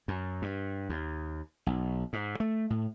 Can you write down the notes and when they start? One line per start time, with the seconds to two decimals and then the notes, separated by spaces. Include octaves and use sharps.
0.08 F#2
0.42 G2
0.89 D#2
1.66 B1
2.13 G#2
2.40 A3
2.70 A2